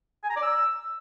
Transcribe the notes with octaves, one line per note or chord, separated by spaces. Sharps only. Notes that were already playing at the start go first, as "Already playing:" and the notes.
G#5
A#5
D5
E6